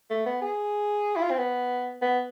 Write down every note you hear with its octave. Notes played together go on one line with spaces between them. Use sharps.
A3
B3
G#4
E4
F4
C4
B3
B3